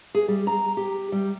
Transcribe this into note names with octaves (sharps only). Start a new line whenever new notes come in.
G#4
G3
A#5
G4
G3